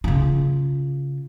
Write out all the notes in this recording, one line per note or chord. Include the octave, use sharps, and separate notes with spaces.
C#3 F4